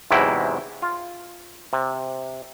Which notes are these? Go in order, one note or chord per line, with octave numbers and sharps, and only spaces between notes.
E2 G#2 C3 F#3 E4 G5
F4
C3